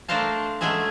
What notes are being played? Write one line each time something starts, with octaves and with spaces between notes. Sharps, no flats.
A3 D4 A#4 C5 F5 A5
F#3 G#3 A3 C#4 G#4 E5